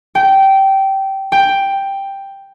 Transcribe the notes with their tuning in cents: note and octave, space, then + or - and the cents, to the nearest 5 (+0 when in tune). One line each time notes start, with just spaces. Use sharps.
G5 -15
G5 +5